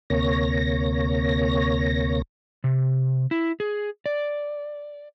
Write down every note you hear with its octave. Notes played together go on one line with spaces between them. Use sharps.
D2 C3 A#3 C#5 A#6
C3
E4
G#4
D5